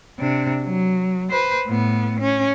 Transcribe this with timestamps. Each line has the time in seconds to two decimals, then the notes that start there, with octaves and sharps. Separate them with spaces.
0.19 C3 D4
0.64 F#3
1.30 B4 C5
1.67 A2 B3
2.20 C#4